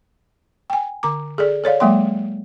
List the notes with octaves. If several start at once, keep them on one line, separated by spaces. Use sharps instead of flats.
G5 G#5
D3 A#5 D6
G#4 A4 D5
A4 C#5 D5 F5
F#3 G#3 A#3 F#5 C6